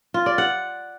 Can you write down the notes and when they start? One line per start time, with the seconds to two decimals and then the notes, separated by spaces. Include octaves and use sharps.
0.14 F4
0.26 D5
0.38 F#5